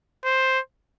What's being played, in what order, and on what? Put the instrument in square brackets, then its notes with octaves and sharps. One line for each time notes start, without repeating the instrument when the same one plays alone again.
[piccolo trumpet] C5